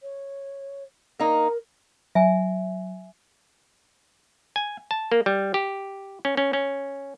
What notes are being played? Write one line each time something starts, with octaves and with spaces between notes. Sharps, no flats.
C#5
A#3 D#4 A#4
F#3 E5 G#5
G#5
A5
A#3
G3
G4
C#4
C#4
C#4